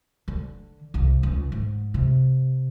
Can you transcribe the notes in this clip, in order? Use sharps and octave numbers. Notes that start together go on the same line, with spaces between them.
D3
C2
C#2
G#2
C3